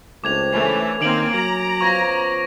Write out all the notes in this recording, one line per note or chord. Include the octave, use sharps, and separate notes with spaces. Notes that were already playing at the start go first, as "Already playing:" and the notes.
C#2 A3 C4 D4 D6 G#6 F7
E3 A3 C#4 G#5
D#3 A#3 C4 D6 D7 F#7
F#3 A#5
B2 F3 F4 C#6 G#6 A#6